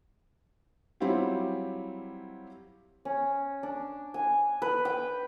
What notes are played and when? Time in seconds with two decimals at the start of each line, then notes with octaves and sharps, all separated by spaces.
1.00 F#3 G3 C4 E4 F4 G4
3.05 C#4
3.63 D4
4.14 G#5
4.62 B4
4.85 G5